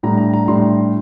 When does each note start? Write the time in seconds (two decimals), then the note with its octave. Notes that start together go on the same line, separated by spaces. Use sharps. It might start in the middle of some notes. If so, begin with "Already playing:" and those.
0.03 A2 G3 D4 A#5
0.18 A#5
0.33 A#5
0.47 A2 G3 D4 C6